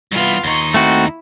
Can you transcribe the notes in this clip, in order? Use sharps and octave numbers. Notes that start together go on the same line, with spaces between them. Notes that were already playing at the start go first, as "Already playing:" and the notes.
G2 E3 B3 F4
D#2 D#4 C6 C#6
A3 C4 E4 F#4